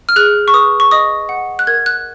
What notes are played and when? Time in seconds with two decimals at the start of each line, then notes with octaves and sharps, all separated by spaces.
0.09 F6
0.16 G#4 F#6
0.48 C#6
0.54 B4 D#6
0.80 C#6
0.91 D#5 D#6
1.29 F#5
1.59 F#6
1.67 A#4 G#6
1.86 F#6